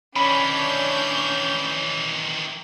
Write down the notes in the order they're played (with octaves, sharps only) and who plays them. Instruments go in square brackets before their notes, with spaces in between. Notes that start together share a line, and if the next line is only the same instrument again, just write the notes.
[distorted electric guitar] D#3 E3 [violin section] C#4 D4 G6 [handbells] B5